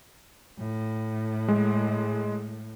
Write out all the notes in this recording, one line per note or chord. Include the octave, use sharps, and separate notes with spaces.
A2
G#3